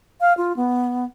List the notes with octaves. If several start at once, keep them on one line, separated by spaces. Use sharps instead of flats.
F5
F4
B3